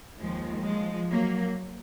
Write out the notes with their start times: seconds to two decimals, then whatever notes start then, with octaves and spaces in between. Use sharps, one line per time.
0.20 D#2 D#3 F3 G#3
0.65 F3 G#3
1.10 F#3 A#3